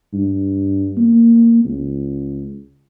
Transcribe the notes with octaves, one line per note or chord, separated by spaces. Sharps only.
G2
A#3
C#2